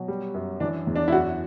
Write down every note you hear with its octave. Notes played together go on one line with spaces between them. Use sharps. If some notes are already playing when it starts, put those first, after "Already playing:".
Already playing: B2 F#3
G3
F#2
E3 D4
E2
D4
E4
F#2 F#4